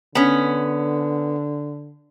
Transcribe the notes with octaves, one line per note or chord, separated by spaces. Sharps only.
D3 B3 C#4